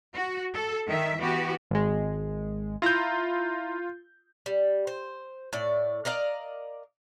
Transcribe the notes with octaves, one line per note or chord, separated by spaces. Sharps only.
F#4
A4
D#3 E5
E3 B3 F#4 G4
G#1 G#3
E4 F4 A#5 G6
G3
C5
A2 D5
A#4 D5 D#5 F5